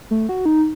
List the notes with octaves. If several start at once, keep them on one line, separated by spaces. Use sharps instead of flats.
A3
F#4
D#4